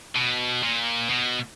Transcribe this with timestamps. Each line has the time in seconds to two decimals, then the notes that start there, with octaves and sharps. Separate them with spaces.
0.16 B2
0.63 A#2
1.09 B2